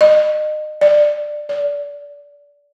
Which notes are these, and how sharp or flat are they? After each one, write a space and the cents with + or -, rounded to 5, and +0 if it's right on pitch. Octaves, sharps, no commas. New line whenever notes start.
D#5 -30
D5 +15
D5 -25